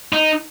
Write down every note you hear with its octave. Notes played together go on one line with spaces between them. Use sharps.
D#4